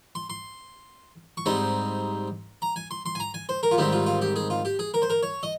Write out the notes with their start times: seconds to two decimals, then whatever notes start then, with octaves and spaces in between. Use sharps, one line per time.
0.15 C6
0.30 C6
1.37 C#6
1.46 G#2 G3 C4 D#4 C6
2.62 A#5
2.76 G#5
2.91 C6
3.06 C6
3.15 G#5
3.20 A#5
3.34 G#5
3.49 C5
3.63 A#4
3.71 F4
3.78 G#2 D#3 G3 C4 G4
3.92 F4
4.06 F4
4.22 G4
4.36 G#4
4.50 F4
4.65 G4
4.79 G#4
4.94 A#4
5.02 C5
5.10 A#4
5.23 C#5
5.43 D#5